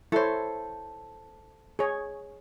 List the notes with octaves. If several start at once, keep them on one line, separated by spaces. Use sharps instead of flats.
E4 A4 C5 C#5
G#4 C#5